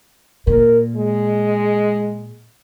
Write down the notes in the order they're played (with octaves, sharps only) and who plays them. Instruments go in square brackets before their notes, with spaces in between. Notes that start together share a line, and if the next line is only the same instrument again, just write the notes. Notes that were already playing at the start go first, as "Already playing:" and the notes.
[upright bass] A#2 [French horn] A#4
[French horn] G#3